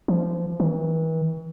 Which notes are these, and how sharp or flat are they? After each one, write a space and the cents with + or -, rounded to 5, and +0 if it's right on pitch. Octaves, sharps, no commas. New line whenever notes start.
F3 -25
E3 -40